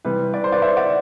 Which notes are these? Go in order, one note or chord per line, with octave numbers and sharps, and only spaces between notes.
C3 E3 G3 B4
B4 D5
C5
B4 D5
C5 E5
D5 F#5